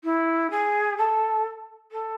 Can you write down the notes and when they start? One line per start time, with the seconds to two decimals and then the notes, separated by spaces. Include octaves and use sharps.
0.04 E4
0.51 G#4
0.98 A4
1.91 A4